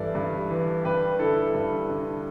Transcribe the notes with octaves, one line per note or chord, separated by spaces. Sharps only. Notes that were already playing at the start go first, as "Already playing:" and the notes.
Already playing: G2 E3 A4 D5 E5
G2
E3
G2 G4 B4
D3 E4 A4
G2
D3